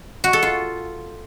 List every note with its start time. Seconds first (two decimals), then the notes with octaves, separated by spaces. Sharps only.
0.24 F#4
0.33 A4
0.43 F4